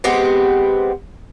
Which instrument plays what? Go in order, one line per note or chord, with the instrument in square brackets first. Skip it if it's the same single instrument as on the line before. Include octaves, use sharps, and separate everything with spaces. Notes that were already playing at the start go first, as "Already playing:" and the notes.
[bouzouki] G#3 B3 C4 G4